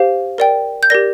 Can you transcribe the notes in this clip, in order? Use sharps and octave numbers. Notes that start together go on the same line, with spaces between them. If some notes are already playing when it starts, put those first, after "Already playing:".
Already playing: G4 C5 F5
A#4 D5 G5
G6
G4 A#4 D5 A#6